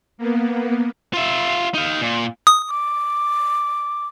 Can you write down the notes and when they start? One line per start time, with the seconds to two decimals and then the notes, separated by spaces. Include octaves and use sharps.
0.18 A#3 B3
1.14 F4 E5
1.74 D#4 F5
2.01 A#2
2.47 D#6
2.69 D6